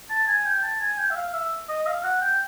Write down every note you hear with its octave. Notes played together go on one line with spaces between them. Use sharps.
A5
G#5
G5
A5
G#5
G5
E5
F5
E5
D#5
F5
F#5
G5